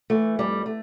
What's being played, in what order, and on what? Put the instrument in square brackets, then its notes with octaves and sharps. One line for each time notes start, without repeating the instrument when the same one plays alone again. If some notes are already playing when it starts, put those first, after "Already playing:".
[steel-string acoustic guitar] E3 A3
F2 G3
A3